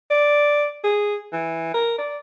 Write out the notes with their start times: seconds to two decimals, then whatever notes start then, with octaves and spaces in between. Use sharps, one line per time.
0.10 D5
0.84 G#4
1.33 E3
1.74 A#4
1.98 D5